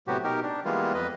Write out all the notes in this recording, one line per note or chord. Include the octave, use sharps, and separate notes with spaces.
A2 C3 F#3 B3 F#4 G4
B2 D#4 G4 A#4
D4
E3 G3 G#3 A#3 B3 F4
F2 B4 D#5